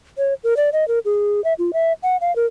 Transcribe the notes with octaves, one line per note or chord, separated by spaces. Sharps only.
C#5
A#4
D5
D#5
A#4
G#4
E5
F4
E5
F#5
F5
A#4